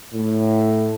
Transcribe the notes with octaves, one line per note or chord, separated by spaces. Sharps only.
A2